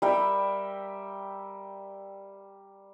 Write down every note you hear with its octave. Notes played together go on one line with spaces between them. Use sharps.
G3 A#4 E5 G5